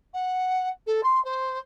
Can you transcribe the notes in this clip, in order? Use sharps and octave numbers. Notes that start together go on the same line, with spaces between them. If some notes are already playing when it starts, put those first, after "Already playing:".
F#5
A4
C6
C5